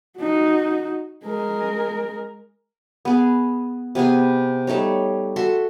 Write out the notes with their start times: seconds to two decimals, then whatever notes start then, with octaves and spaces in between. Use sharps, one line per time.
0.19 D#4 F#4
1.25 G#3 A#4
3.05 B3 G#4
3.95 C3 B3 G#4 G#5
4.67 G3 A3 D#4 C#5
5.36 F#4 A4 E5 C6